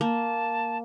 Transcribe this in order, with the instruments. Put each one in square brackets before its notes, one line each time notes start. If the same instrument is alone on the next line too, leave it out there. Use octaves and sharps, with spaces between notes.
[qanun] A#3 [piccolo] A5